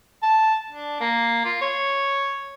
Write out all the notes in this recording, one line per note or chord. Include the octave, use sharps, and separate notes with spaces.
A5
D4
A#3
F4
C#5